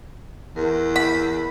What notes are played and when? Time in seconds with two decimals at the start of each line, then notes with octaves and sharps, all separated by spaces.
0.56 E2 A#4
0.96 B5